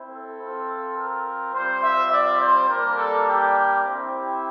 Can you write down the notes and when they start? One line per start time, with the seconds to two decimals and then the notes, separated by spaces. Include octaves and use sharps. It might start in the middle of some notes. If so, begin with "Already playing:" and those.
Already playing: C4 E4
0.09 A4
0.39 C4 F4
0.96 A#4
1.53 G3 C4 F4 C5
1.83 E5
2.11 D5
2.40 C5
2.69 G3 A#3 D4 A#4
2.97 A4
3.27 G4
3.84 C4 E4 G4